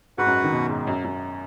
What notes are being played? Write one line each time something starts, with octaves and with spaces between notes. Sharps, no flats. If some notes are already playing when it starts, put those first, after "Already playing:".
G#2 F#4 B4 F#5
F#2
D#3
B2
G#2
F#2
F#2